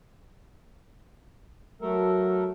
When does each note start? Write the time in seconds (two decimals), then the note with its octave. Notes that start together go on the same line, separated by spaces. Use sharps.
1.82 F#3 A3 A4 A#4